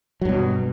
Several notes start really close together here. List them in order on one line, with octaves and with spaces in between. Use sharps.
F#3 G2 B2